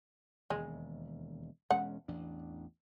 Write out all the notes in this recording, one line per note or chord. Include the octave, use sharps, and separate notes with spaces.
E1 D#2 G#3
E1 G#3 C#4 F#5
A1 E2 D4